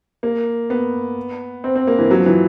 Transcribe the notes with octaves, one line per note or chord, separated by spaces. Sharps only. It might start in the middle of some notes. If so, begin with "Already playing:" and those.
A#3
B3
C4
C4
A#3
E3
F#3
F3
E3